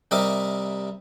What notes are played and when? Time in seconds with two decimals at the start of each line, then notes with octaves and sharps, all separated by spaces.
0.11 C3 G3 A#4 D#5 E5 D6